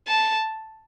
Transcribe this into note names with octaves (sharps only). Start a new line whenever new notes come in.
A5